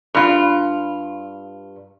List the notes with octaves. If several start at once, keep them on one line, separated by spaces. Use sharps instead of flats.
G2 F4